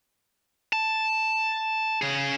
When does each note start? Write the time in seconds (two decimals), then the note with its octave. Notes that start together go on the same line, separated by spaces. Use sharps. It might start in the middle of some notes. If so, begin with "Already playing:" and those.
0.73 A5
2.02 C#3 G#4